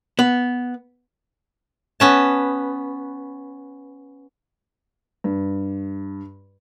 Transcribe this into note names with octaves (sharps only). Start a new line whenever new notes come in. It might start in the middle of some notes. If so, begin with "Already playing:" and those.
B3
B3 C#4 A5
G2